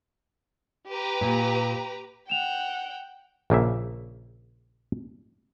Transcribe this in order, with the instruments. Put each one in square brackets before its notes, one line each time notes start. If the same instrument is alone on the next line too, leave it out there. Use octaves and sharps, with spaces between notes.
[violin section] G4 B4 A#5
[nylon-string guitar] A#2
[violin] F#5 G5 [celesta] E7 F7
[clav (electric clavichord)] A#1 C#3 A#3 E5